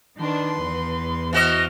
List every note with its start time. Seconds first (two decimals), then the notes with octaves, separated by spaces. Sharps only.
0.20 D#3 D4 B4 C6
0.59 E2
1.33 E3 F#4 C5 D#5 F6